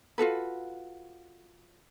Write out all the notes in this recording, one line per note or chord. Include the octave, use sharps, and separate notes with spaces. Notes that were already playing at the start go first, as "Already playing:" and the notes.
F4 F#4 A4 B4